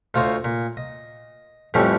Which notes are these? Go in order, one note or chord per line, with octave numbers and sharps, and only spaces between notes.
D2 F4 C5 C#5 D#5
A#2
D#5
F2 A2 E3 G3 C#4